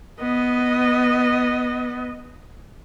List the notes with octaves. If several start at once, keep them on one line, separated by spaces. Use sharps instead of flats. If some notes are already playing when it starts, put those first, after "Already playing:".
B3 D#5